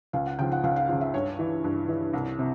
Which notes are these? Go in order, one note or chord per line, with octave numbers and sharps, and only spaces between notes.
C#2 F5
F#5
C#3 F3 G5
F#5
C#2 F5
F5
C#3 F3 F5
E5
G2 C#5
E3
G2
E3
C2
C3